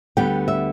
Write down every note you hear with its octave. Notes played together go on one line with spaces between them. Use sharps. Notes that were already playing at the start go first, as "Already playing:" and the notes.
D2 D3 G3 B3 G5
E5